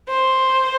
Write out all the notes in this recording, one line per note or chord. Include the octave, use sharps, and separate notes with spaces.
C5